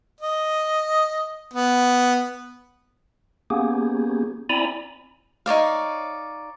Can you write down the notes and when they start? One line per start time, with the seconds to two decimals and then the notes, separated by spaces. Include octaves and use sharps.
0.21 D#5
1.54 B3
3.50 A#3 B3 C#4 G4 G#4
4.49 C4 E4 D5 G#5 A#5 B5
5.46 D#4 C#5 D5 F5